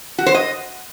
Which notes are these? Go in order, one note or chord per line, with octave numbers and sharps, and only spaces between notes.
F#4
C5
D#5